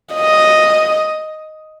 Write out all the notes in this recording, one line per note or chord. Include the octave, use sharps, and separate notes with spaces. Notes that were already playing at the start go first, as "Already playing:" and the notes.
D#5